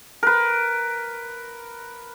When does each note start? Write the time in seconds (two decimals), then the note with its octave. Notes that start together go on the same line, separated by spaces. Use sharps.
0.23 A#4 B4